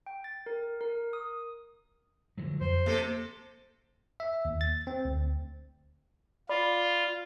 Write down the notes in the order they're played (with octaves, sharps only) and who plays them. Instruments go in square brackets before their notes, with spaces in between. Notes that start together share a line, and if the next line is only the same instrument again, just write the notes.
[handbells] G5
A6
A#4
A#4
D#6
[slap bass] D3 F3 F#3
[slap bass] F2 [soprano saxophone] C5
[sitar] C3 A4 [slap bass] A#3
[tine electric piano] E5
D#2
A6
C4
D2
[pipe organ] F4 [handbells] D5 B5